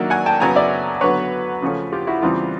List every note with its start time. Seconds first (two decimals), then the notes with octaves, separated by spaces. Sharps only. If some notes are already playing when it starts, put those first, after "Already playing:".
Already playing: D#3 F#3 A#3 D4 E5
0.10 F#5 G#5
0.26 G5 A5
0.40 F#2 C#3 F#3 B3 G#5 A#5
0.56 D5 E5
1.01 D3 F#3 B3 B4 C#5
1.62 C#3 F3 A3 C#4
1.92 F4 G4
2.07 E4 F#4
2.22 E2 C#3 E3 G3 C4 F4